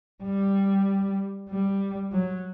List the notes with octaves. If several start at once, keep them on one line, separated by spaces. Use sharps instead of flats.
G3
G3
F#3